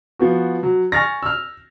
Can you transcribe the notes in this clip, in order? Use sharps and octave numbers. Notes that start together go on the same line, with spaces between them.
F3 B3 F#4
F#3
G#5 C#6 F6 A6 A#6
E6 F6